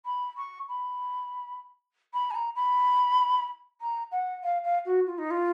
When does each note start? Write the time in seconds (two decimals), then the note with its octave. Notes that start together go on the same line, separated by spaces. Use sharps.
0.05 B5
0.37 C#6
0.68 B5
2.13 B5
2.30 G#5
2.35 A#5
2.55 B5
3.81 A#5
4.11 F#5
4.43 F5
4.64 F5
4.85 F#4
5.06 F4
5.18 D#4
5.30 F4